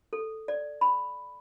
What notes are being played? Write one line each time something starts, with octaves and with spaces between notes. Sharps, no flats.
A4
D5
B5